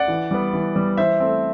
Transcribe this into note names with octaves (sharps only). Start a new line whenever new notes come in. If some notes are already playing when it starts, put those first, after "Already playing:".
Already playing: D5 F#5
E3
G3 B3
E3
G3 B3
E3 C5 E5
A3 C4